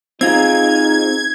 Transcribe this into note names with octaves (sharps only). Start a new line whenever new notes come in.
C4 D#4 F4 G#4 G#6